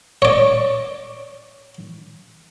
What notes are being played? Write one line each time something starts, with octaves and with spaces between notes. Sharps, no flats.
C#5 D5